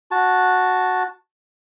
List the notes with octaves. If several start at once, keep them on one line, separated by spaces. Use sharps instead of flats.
F#4 A5